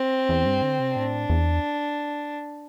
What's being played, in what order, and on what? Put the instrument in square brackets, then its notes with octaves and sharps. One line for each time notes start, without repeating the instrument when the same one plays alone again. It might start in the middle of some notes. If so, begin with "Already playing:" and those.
Already playing: [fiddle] C4
[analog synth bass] E2
G2
D3
C3
[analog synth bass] A2 [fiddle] D4
[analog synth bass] E2